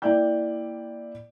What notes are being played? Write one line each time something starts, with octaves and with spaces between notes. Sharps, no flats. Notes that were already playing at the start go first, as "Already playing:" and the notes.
A#3 E4 D5 G5 G6